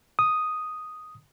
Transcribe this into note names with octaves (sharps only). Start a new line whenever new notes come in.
D#6